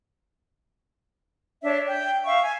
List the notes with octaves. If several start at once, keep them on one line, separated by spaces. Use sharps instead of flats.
D4 C#5 E5
G5
E5 F5 C#6
G#5